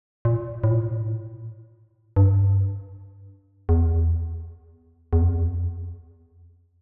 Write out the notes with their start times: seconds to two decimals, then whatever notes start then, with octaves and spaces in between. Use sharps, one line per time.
0.25 A#2
0.64 A2
0.71 A#2
0.79 A2
2.16 G2
3.69 E2
5.13 E2
5.22 F2